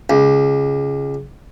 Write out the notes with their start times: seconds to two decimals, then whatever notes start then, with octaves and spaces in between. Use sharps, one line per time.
0.10 C#2